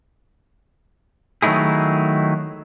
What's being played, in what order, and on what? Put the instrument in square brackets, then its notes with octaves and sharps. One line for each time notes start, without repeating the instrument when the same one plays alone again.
[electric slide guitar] D#3 F#3 A3 D#4 E4 G#4